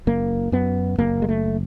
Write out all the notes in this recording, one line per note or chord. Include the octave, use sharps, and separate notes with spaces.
F#1 A#3
F#2 B3
F#1 A#3
G#3
A3